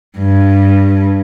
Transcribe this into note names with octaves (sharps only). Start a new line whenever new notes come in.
G2